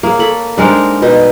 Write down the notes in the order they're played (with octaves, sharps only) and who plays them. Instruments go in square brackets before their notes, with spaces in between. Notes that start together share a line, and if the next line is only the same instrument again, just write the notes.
[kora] A#3 [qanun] G#4 C#5
[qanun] A4 B5
[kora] G3 G#3 A#4 [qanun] D4 D#4 C5
[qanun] B2 D#4 B4